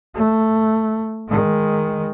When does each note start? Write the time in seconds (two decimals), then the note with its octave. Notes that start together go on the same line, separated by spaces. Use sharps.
0.14 A3
1.28 D#3 G#3